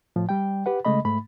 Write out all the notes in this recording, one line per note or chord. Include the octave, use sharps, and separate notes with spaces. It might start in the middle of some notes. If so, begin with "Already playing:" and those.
A2 F3
G3 G5
G4 B4 F#5
C#3 G#3 A3 D#5 B5
G#2 A3 B5